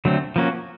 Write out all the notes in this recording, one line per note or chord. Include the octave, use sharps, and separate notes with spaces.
D3 F#3 A3 C4
F3 A#3 C#4 F#4